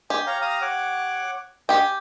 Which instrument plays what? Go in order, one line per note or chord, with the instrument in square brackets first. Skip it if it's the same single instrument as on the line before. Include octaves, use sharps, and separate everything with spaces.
[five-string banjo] G4 [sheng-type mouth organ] G#5
[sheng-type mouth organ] C#5 F5 A#5
F5 A#5 D#6
C#5 F#5 D6
[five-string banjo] G4 G5 [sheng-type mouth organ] G#5